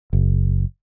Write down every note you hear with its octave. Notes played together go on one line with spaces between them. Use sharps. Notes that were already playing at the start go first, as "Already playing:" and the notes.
F#1